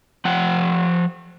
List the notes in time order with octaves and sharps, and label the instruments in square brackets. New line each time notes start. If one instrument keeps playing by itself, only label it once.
[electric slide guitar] F3 F#5 G5